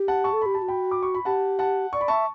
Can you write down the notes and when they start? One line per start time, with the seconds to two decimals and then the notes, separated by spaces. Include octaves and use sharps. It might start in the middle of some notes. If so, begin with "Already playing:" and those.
Already playing: G4
0.08 F#5 A5
0.24 A5 C#6
0.33 A4
0.42 G4 B5
0.54 G4 A5
0.62 F#4
0.68 G5 B5
0.91 D6
1.03 C#6
1.15 B5
1.25 G4 F#5 A5
1.59 F#5 A5
1.93 D5 C#6
2.01 B5
2.08 E5 A5 C#6